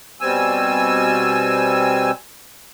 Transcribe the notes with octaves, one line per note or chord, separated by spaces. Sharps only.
B2 G3 C4 G#5 E6